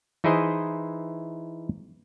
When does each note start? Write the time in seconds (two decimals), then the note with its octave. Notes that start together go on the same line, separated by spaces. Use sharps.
0.24 E3 D#4 E4 G#4 C5 D#5